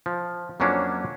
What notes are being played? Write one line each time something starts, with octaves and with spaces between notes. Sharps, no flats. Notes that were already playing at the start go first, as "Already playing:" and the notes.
F3
F2 F#3 A#3 C#4 D4